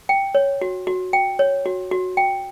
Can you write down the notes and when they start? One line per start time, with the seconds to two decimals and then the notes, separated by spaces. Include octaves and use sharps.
0.09 G5
0.35 C#5
0.61 F#4
0.87 F#4
1.13 G5
1.39 C#5
1.66 F#4
1.91 F#4
2.17 G5